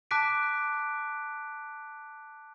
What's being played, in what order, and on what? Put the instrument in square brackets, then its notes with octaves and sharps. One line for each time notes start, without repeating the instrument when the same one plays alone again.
[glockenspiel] A5 D6 F#6 B6 D7